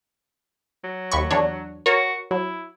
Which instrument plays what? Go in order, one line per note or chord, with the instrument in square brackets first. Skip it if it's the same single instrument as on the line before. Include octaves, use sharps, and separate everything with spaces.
[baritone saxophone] F#3
[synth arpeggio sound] D#2 B5 C#6
E2 D4 C#5
[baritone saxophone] F#4 [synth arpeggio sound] A#4 C#5
[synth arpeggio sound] F#3 [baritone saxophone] E4